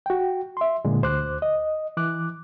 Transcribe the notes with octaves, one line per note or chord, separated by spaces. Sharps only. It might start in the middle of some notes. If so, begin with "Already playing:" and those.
F#4 G5
E5 C6
A#2 D3 G#3
D2 C5 D6 F#6
D#5
E3 D6 F#6